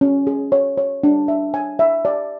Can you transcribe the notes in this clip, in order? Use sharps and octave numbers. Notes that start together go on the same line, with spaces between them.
C#4
G#4
C#5
C#5
D4
E5
G#5
E5
D5